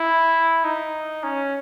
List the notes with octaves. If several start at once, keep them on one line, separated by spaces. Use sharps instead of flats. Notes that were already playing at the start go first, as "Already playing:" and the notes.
Already playing: E4
D#4
C#4